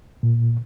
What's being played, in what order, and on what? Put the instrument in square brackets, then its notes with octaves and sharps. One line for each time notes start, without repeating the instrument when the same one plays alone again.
[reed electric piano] A#2